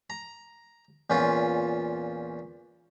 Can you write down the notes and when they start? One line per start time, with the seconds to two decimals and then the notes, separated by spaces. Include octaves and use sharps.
0.10 A#5
1.10 E2 A#2 C#4 F4